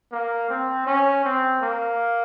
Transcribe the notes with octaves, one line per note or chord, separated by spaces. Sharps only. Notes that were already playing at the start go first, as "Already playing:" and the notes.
A#3
C4
C#4
C4
A#3